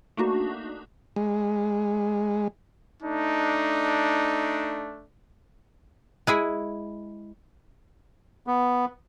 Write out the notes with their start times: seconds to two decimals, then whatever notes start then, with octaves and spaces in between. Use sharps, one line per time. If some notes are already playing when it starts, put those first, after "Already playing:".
0.17 A3 A#3 D4 D#4 F#4
1.16 G#3
3.03 A3 D4 D#4
6.27 G#3 E4 G#4
8.47 B3